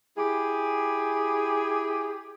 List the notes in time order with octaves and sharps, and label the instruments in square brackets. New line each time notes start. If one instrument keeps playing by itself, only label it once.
[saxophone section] E4 G4 G#4